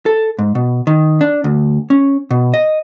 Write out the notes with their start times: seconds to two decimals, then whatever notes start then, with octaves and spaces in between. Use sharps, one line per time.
0.06 A4
0.39 G#2
0.55 B2
0.87 D#3
1.21 D4
1.44 D2
1.90 C#4
2.31 B2
2.54 D#5